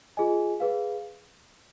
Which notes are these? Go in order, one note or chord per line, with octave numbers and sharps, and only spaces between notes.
F4 G#4 D#5 G#5
G#4 B4 F5